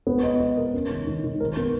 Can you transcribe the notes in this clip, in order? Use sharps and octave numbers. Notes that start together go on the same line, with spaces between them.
B3
D#5
D#5
A#4
C#4
D#3
D#3
D#3
A#4
B3